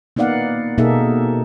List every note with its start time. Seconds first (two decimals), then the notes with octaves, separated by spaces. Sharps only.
0.16 A#3 B3 D#4 D5 F5 F#5
0.78 B2 A#3 D#4 G#4 A4 E5